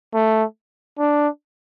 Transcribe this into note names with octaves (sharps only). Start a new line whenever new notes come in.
A3
D4